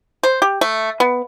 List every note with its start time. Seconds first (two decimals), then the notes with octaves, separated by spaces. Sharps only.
0.23 C5
0.42 G4
0.61 A3
1.00 B3